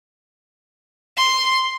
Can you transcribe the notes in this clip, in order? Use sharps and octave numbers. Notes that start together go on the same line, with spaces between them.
C6